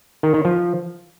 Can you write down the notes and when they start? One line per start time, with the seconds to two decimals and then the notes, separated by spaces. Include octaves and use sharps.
0.23 D#3
0.34 D#3
0.45 F3